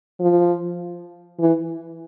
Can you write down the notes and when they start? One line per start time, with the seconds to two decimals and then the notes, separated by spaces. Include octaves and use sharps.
0.20 F3
1.39 E3